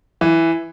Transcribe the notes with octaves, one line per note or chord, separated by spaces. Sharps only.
E3